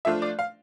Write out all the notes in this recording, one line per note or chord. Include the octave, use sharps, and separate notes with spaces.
F3 A3 D4 F4 E5
D5
F5